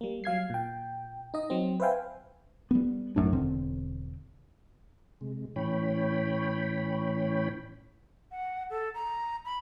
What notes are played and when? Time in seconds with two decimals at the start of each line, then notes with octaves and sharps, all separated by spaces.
0.01 G3 A#3
0.24 F#3 F5 G#6 C7
0.50 A#2 G5
1.34 D#4 D#5
1.50 F#3 C4
1.80 B4 C5 E5 F5 G5 G#5
2.71 G3 B3
3.16 G#1 F#2 A2 D4
3.33 E1 D3 C4
5.21 C3 G#3
5.56 A2 E3 C#4 C#5 G5 B5
8.31 F#5
8.70 A4
8.94 A#5
9.45 B5